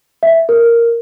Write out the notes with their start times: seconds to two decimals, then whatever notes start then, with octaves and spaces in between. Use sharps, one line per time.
0.23 E5
0.49 A#4